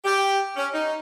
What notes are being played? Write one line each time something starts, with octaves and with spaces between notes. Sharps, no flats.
G4
C#4
D#4